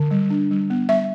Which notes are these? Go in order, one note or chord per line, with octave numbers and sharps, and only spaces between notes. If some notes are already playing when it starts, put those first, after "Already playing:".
Already playing: D3
G3
D4
G3
B3
G3 E5